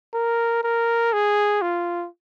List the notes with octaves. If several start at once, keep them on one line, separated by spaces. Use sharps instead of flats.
A#4
A#4
G#4
F4